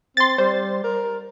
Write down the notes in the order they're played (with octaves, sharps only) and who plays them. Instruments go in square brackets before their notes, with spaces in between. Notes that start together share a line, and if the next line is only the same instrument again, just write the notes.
[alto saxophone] C4 [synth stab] C6 A6
[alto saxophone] G3 [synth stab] C5
[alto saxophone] A#4